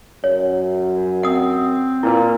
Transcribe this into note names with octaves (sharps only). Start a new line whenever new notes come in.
F#2 C#5
C4 F#5 D#6
A#2 E4 B4